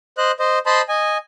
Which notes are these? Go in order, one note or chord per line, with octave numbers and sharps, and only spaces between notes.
C5 D#5 F#6
C5 D#5
C5 D#5 A5 B5 C6
D#5 G#5